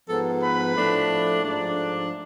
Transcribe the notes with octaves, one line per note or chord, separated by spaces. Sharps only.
G#2 F3 B3 A4 A5
B4 B5
A2 F3 A3 D4
G#2 F3 A3 D4